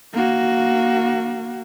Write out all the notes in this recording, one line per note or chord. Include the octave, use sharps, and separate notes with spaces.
A#3 F#4